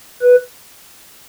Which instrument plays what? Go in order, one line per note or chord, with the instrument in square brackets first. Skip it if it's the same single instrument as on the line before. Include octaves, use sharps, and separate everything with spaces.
[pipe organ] B4